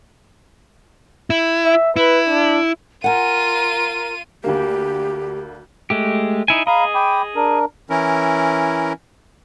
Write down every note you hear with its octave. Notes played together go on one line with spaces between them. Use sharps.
E4
E5
E4 B4
D4
F4 A#4 F#5 G#5 D#7
D2 D3 A#3 G4
G#3 A3 G4
D#4 E4 G#5
G#4 D#5 F5 A#5 B5
G5 B5 D6
D4 A#4
E3 C#4 E4 A#4